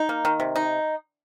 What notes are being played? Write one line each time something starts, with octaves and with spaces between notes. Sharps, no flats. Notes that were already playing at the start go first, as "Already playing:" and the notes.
Already playing: D#4
A#3
D#3
C3
D#4